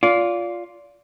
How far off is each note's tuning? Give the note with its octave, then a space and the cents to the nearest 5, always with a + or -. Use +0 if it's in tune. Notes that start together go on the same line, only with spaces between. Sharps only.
F4 +5 D5 -25